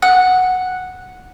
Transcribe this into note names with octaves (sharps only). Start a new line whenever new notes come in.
F#5